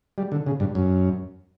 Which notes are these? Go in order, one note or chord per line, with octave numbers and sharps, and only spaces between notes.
G3
D3
C#3
G2
F#2